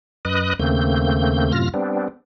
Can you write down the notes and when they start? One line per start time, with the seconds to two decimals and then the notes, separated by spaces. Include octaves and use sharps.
0.25 F#2 B4 D#5 D#6 F#6
0.59 D#2 C#3 A3 A#3 C4 G6
1.52 F#2 A2 C3 F4 F6 A#6
1.74 G3 B3 C4 D4